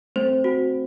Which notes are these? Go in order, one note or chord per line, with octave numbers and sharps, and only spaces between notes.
A3 C4 C5
F#4